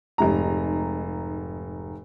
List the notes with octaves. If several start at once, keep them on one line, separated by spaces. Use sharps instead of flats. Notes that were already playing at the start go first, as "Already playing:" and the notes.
F1 G#2 A#5